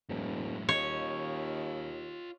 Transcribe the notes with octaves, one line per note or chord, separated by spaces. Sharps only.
E1 F#2 A2
D#2 F4 C#5 D#5